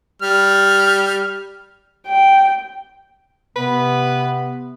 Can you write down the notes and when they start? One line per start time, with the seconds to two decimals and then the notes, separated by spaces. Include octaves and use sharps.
0.22 G3 F6
2.07 G5
3.56 C3 B3 B4